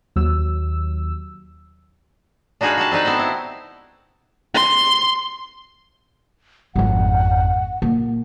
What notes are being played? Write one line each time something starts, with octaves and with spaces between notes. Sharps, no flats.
D#2 F#3 E6
D4 D#4 F#4 G#4 B4 F5
F#4 G4 A5
C4 D4 D#4 B4
B3 C4 C5 A5
E4
C6
G#1 F2 F#5
A#2